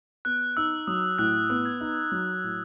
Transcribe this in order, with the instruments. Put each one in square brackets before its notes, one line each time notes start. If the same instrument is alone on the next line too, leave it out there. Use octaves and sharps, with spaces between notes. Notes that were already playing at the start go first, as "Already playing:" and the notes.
[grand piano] B3 [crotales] F#6
[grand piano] D#4 [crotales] E6
[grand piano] F#3 [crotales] D#6
[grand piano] A2 [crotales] F#6
[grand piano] B3
[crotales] G#6
[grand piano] D#4
F#3
A2